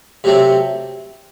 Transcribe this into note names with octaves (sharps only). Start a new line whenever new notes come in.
C3 F#3 A3 C4